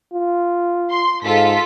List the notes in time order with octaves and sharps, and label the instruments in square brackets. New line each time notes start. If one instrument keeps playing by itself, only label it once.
[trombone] F4
[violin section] C6
[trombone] G#2 [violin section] F4 A4 B6